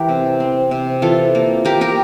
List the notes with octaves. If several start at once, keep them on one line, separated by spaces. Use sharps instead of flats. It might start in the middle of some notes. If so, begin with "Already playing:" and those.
Already playing: E3 G4 A#4
C3
C4
C3
E3 F4 A4
A#3
A#3 G4 A#4
G4 A#4